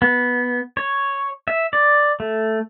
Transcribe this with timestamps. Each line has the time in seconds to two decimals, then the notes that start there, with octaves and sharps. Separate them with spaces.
0.02 B3
0.77 C#5
1.48 E5
1.73 D5
2.20 A3